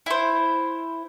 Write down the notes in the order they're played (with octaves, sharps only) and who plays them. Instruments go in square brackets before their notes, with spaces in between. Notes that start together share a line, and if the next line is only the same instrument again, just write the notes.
[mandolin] E4 C5